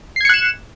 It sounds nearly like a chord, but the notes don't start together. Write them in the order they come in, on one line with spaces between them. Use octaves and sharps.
C7 G#6 C#7 F#6 E7